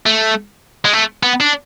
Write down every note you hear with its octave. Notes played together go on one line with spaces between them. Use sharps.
A3
G#3
A3
B3
D4